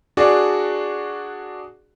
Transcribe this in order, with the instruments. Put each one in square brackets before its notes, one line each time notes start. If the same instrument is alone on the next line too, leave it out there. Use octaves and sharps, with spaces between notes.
[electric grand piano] D4 F#4 G#4 D5